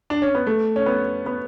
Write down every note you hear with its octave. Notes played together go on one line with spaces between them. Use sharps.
D4
C#4
B3
A3
C#4
B3
B3